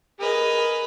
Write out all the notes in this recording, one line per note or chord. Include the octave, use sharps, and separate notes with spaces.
G#4 A#4 B4 D#5